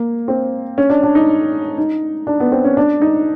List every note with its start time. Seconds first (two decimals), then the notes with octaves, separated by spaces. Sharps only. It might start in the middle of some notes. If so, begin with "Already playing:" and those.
Already playing: A#3
0.28 C4
0.78 C#4
0.90 D4
1.03 D4
1.15 D#4
1.78 D#4
2.27 D4
2.40 B3
2.52 C4
2.64 C#4
2.77 D4
3.02 D#4